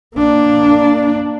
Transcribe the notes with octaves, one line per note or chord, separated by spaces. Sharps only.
A#3 D4